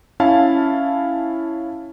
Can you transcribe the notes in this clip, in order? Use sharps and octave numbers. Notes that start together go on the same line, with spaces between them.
C#4 E4 F5 A5